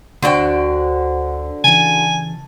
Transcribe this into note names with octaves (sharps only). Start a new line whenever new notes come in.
D2 D3 D4 F#4 C5 G5
C#3 E3 G#5 A5